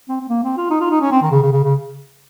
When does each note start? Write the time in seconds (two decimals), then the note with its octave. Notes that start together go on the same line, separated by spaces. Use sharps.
0.08 C4
0.20 C4
0.29 A#3
0.43 C4
0.57 F4
0.70 D#4
0.80 F4
0.91 D#4
1.01 C#4
1.11 C4
1.22 D#3
1.31 C#3
1.42 C#3
1.52 C#3
1.63 C#3